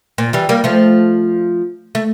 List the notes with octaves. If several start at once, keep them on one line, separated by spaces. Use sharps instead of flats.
A#2
E3 G3
G3 A#3
F3 A3
A3